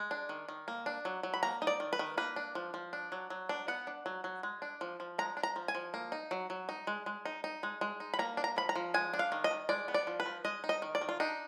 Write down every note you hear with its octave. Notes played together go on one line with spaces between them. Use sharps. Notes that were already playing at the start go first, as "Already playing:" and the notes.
Already playing: G#3
D4
D#3
D#3
A#3
D4
F#3
F#3
B5
A#3 A#5
D#4
D5
D#3
B4
D#3
A#3 B4
D4
F3
F3
D4
F#3
F#3
D4
B3 F#5
D4
F#3
F#3
G#3
D4
F3
F3
G#3 A#5
D4
A#5
F3
G#5
F3
A#3
D#4
F#3
F#3
D#4
G#3
G#3
D#4
D#4
G#3
G#3
D#4
B5
A#3 A#5
D4
A#5
F3 B5
A#5
F3
G#3 G#5
D4
F5
D#3
D#5
D#3
G#3 D5
B3
D5
F3
B4
F3
G#3 D#5
D#4
D#5
D#3
D5
D#3
F4
D4 D#4